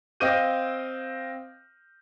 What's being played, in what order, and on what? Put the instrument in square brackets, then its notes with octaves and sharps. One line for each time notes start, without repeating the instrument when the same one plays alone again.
[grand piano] C4 D#5 F5 D6 G6 D#7